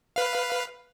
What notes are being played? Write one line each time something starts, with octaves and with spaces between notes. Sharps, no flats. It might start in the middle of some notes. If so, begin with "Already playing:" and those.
B4 F5